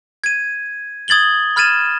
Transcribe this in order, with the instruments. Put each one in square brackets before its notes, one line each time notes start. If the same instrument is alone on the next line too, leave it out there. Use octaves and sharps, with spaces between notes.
[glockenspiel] G#6 D#7
D#6 G#6 A6 F#7 G7
B5 F6 G#6 A6 D#7 E7